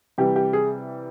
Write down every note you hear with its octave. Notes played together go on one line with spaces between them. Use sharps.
C3 E3 G3 G4
G4
G#4